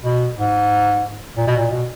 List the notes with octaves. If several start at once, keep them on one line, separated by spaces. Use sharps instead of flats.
B2
G#2
A#2
B2
A#2
B2